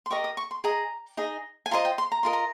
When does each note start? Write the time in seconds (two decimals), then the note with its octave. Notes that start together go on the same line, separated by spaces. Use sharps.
0.06 C6
0.10 G4 A#4 D#5 C#6
0.24 D#6
0.37 C#6
0.51 C6
0.64 G#4 D#5 A#5
1.17 D#4 G#4 D#5
1.66 G#5
1.71 F4 C5 D#5 A#5
1.85 G5
1.98 C6
2.12 A#5
2.23 F4 A#4 D#5 C6
2.33 A#5